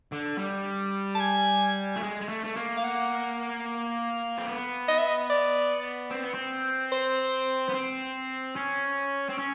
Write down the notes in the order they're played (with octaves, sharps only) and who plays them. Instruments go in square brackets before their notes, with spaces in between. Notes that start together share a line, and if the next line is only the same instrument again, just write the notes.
[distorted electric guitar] D3
G3
[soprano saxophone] A5
G#5
[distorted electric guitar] A3
G#3
G#3
A3
A3
A#3
[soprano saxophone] F5
F#5
[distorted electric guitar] C4
B3
[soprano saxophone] D#5
E5
D#5
D5
[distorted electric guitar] C4
B3
C4
[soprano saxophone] C5
[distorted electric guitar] B3
C4
C#4
C4
C#4